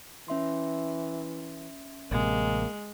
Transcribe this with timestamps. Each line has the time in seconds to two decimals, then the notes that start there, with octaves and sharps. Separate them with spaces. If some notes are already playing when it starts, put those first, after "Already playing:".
0.28 E3 C#4 E5 C6
2.11 A1 C3 G#3 A#3